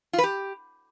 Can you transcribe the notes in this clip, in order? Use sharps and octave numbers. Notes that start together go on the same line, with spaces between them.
F4
B4
G4